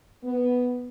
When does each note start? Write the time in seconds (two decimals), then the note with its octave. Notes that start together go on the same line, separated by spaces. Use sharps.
0.23 B3